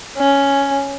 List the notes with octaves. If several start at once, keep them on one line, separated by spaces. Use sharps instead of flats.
C#4